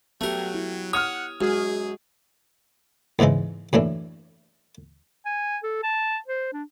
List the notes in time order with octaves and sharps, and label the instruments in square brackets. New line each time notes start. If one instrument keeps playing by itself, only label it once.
[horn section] F#3 [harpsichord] A3 A#4 [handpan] B3 G4
[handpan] E4
[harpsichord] C#5 [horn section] F#5 [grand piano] D#6 F6
[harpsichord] F#2 [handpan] G#3 F#4 [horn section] G#4
[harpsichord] E2 G#2 C#3 E3 G#3
F#2 A2 E3 D4
[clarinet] G#5
A4
A5
C5
D4